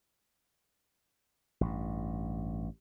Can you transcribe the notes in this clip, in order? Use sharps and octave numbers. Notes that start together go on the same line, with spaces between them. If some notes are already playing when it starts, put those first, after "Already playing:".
A1 G2